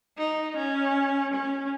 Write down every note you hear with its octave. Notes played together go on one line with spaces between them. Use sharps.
D#4
C#4
C#4